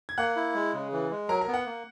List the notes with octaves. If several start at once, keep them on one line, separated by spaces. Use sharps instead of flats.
G#6
A#3 F#5 F#6
E4
G#3
C#3
E3
G#3
F#3 A#4 A#5
A#4 A#5
B3
F#5
A#3